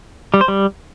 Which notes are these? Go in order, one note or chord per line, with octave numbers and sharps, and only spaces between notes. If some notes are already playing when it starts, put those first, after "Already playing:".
G3
C5
G3